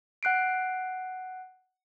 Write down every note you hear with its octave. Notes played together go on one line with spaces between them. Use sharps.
F#5 F#6 C7 D7